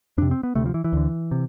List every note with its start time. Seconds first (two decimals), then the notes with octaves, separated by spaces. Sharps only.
0.18 F2 D4
0.22 C3
0.31 C4
0.43 B3
0.55 D2 C3 A3
0.66 F3
0.74 E3
0.84 E3
0.93 D2 D3
1.31 C3